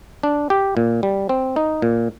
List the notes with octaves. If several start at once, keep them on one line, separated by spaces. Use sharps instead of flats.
D4
G4
A#2
G3
C4
D#4
A#2